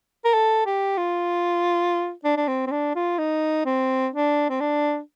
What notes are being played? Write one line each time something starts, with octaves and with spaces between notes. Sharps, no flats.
A#4
A4
G4
F4
D4
D4
C4
C4
D4
F4
D#4
C4
D4
C4
D4